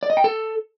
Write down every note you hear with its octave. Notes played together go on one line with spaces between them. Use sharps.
D5
D#5
G5
A4